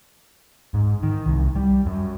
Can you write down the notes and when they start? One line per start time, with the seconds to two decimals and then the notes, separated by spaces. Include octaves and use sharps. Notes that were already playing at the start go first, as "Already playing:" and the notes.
0.74 G#2
1.03 D#3
1.26 C2
1.56 G3
1.86 F#2